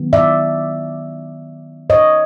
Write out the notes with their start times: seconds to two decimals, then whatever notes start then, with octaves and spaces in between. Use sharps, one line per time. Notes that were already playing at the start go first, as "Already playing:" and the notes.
Already playing: D#3 F#3 B3
0.13 D5 E5
1.90 C#5 D#5